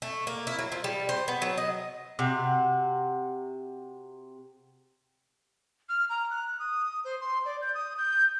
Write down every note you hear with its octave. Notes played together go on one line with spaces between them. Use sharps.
A3
A#3
E4
F#3
F3
G3
C5
B3
F#3
D#5
C3 F#4
F6
A#5
F#6
D#6
C5
C6
D5
G6
D#6
G6